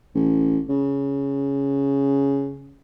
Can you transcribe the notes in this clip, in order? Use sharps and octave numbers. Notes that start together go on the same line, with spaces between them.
A1
C#3